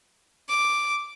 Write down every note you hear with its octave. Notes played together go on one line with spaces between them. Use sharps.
D6